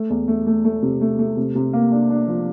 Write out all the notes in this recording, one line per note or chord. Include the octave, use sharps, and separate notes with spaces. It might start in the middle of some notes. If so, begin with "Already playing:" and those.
Already playing: A3
E2
A3
A3
A3
C3
A3
A3
C3
C3
A#3
D4
D4
F3